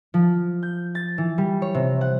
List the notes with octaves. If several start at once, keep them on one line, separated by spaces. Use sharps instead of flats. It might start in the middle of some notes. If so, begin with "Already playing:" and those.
F3
G6
A6
E3
G3
C#5
C3
F#5